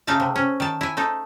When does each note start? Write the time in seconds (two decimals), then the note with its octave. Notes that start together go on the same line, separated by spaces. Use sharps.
0.07 C#3 A3 D#4 F5 A5
0.20 C3
0.36 C#4
0.60 D#3 A5
0.81 E4 G#5
0.97 A3 D#4 A4